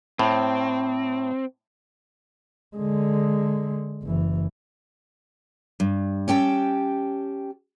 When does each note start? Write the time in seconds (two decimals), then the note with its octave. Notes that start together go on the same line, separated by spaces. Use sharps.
0.19 A2 C4
2.77 D3 G#3
4.03 F#1 E3
5.80 G2
6.28 C#4 G4 G5 A5